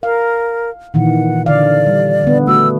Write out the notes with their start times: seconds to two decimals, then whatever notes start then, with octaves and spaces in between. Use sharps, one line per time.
0.03 A#4 F5
0.94 A#2 D#3 E3 F#5
1.46 D3 D5 F5
1.87 G3
2.24 D3 B3
2.47 A3 F#4 E6